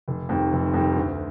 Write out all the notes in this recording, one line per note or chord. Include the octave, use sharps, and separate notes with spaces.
F1
F2 D#3 G3
F1
F2 D#3 G3
D2